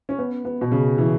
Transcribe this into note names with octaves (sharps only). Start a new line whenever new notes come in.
C#4
B3
B3
B2
C#3
E3